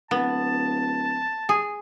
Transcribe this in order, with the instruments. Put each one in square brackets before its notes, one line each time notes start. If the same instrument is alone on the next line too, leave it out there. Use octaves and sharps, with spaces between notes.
[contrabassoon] D1 [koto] B3 [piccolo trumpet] A5
[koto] G#4